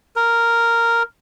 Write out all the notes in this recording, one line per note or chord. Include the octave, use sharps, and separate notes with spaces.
A#4